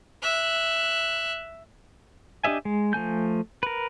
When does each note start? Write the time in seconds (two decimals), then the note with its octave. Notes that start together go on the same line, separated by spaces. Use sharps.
0.22 E5 F#6
2.44 D4 G4 D#5 E5 G#5
2.65 G#3
2.93 F3 A3 G#5 G6
3.63 A#4 B4